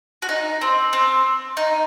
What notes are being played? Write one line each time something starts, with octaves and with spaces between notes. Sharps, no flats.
F#4
D#4
C4
C4
D#4